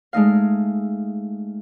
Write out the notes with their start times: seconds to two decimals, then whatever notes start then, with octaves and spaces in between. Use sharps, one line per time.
0.13 G#3 A3 D#4 F5